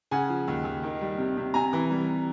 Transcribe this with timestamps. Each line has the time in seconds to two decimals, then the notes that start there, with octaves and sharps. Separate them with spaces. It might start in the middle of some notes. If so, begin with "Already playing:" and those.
0.11 C#3 F#5 G#5
0.29 F3
0.48 D#2
0.65 D#2
0.83 D#3
1.01 G3
1.18 C3
1.37 C3
1.54 C3 G#5 A#5
1.73 E3
1.91 G3